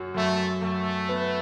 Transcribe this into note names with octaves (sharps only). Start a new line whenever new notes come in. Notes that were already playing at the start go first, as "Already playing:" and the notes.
Already playing: F#2 F#3
F#2 A3
F#2 A3
B3